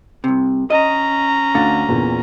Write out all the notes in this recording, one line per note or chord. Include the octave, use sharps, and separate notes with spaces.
C2 C3
C#4 D#5 A#5
D2 D3 F5 A6
E2 A#2